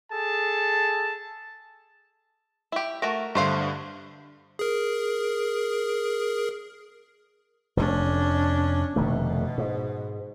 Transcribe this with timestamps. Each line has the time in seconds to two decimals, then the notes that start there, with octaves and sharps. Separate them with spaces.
0.11 G#4 A4 A5
2.72 E4 G4
3.02 A3 F#4 A#4
3.35 G2 D3 A3 C5 F5
4.59 G#4 A#4
7.77 F1 C#4 D4
8.96 F1 B2 D#3 A3
9.58 G#2